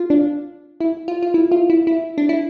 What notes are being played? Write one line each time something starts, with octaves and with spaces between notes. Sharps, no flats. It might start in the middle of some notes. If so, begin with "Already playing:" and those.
Already playing: F4
D4
E4
F4
F4
E4
F4
E4
E4
D4
E4